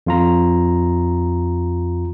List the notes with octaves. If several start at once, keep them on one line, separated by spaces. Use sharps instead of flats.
F2 F4 A#5